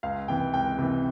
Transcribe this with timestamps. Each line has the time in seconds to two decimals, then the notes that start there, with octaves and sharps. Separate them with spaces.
0.03 C#2 F5
0.28 C3 E3 G5
0.54 C#2 G5
0.78 C3 E3